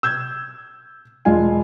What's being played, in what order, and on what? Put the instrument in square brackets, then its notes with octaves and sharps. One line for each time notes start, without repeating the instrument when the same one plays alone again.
[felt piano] E6 G6 G#6
E1 G#3 F4 G#5